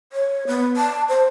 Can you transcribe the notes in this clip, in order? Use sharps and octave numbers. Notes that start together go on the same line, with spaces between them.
C#5
B3
A5
C5